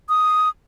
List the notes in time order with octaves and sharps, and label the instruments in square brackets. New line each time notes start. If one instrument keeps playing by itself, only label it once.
[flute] D#6